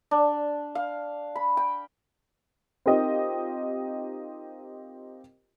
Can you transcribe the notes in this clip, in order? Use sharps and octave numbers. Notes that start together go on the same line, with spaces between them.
D4
F5
B5
G5
C4 D#4 F4 G4 A#4 D#5